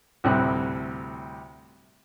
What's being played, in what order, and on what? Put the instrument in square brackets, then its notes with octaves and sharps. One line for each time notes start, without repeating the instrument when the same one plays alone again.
[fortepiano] D2 A2 C3 G3 F#6